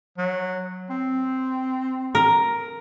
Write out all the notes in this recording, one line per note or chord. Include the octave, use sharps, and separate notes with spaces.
F#3
C4
A#4